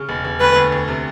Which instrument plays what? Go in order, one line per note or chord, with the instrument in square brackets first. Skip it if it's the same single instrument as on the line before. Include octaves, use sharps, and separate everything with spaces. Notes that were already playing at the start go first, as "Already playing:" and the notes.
Already playing: [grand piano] C#3
E1
E1
[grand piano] D2 [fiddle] B4
[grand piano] D2
D2
C3